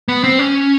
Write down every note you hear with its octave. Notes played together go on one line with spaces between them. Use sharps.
B3
C4
C#4